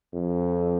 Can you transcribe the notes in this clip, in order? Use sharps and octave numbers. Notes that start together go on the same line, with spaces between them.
F2